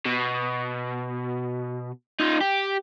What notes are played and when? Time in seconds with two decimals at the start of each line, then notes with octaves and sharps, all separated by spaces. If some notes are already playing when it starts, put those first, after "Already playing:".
0.06 B2
2.20 D#4 F4
2.41 G4